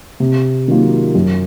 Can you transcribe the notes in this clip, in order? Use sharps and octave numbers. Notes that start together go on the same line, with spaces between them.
C3
D#3 F#3 A#3 F4
F#2